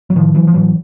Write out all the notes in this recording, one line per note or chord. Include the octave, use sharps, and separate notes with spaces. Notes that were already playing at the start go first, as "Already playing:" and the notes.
F#3
A2 D#3 F3
E3 F#3
F3
A2 E3 F#3